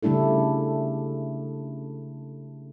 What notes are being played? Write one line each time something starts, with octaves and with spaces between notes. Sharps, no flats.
C#3 G3 A3 D4 E4 A4